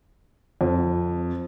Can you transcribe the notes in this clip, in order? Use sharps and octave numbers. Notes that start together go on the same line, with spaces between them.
F2